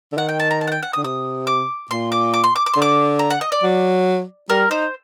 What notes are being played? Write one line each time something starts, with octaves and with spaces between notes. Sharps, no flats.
D3
D#3 F#5
G5
A5
A#5
A5
F#5
G5
F#5
D#6
D3
C3 D#6
D6
A#2 C6
D6
D6
C6
D6
D6
C6
D3
D6
A#5
F#5
D#5
D5
F#3
G3 A#4
D#4 C5